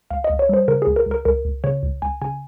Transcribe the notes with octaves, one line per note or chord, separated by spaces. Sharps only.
C#2 F5
D#5
C#2
C#5
G3 C5
C#3 A#4
C#2 G#4
A#4
C#2
A#4
C#2 A#4
C#2
C#3 C#5
C#2
C#2 G#5
C#3 G#5